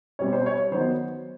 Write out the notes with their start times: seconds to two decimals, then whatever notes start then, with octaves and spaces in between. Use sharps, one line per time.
0.19 B2 G3 C4 C#5
0.33 C5
0.46 C#5
0.71 D#3 F#3 B3 C5